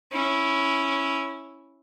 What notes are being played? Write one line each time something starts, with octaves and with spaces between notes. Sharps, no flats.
C#4 E4